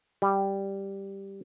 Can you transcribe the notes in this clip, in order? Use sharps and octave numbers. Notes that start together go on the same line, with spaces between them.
G3